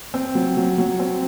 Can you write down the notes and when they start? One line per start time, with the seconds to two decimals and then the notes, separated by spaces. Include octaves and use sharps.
0.14 C4
0.35 F#3
0.57 F#3
0.78 F#3
0.99 C4